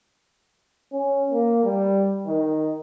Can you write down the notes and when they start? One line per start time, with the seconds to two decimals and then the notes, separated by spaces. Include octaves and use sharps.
0.92 C#4
1.31 A#3
1.64 G3
2.27 D#3